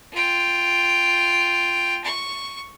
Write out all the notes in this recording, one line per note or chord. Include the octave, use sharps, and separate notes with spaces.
F4 G5
C#6